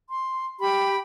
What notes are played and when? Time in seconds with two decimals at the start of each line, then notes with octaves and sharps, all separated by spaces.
0.08 C6
0.60 G4 G5 B5